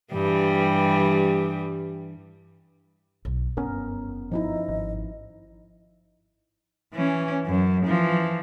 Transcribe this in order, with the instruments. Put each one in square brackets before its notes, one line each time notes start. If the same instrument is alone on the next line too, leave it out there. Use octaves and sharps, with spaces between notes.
[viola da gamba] G2 E3 G3
[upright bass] B1
[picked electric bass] F#1 B3 C#4 [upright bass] G2 [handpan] A#4
[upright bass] G2 [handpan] F3 D#4 E4 [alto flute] D#5
[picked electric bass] G#1
[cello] E3 C#4
F#2
E3 F3